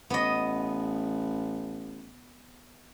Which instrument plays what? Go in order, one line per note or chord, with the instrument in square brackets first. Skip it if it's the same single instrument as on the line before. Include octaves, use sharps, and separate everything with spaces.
[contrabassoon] A1 [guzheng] B3 D#5